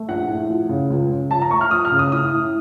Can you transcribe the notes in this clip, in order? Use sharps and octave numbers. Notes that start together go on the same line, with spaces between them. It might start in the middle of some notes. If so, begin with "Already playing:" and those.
Already playing: A3
A#1 F#5
A2
F3
C#3
C#2
C#3
F3 A5
A#5
A3 C#6
F6
F3 D#6
F6
C#3
D#6
A2 D#6
A2